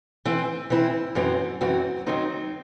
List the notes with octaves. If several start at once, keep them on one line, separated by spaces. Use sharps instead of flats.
E3 C4 E4
E3 C4 E4
F#2 E3 C4 F#4
F#2 E3 C4 F#4
D#3 F#3 C4 D#4